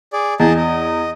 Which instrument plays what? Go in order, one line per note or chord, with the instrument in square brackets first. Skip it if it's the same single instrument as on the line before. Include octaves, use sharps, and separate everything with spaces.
[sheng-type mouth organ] G#4 D5
[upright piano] E2 [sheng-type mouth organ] G#4 D#5 A5
[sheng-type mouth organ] D#5